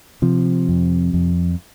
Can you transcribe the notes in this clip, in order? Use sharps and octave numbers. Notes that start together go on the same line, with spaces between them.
C3 F3
F2
F2